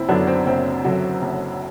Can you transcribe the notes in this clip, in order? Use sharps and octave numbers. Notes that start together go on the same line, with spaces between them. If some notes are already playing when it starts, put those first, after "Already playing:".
Already playing: F#1 C4 E4
F#2 D3 F#3 B3 D4
C4
F#1 C4
F#2 D3 F#3
F#1